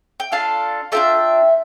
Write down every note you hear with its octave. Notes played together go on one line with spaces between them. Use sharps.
G5
D4 F4 A4 F5 A5
D4 F4 A4 E5 G5